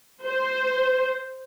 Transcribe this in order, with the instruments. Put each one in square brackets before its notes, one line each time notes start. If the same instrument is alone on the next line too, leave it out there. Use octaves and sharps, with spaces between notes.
[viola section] C5